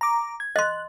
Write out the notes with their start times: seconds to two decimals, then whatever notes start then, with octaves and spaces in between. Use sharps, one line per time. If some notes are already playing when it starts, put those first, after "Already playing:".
0.01 A#5 D6
0.40 G#6
0.56 D#5 C6 F#6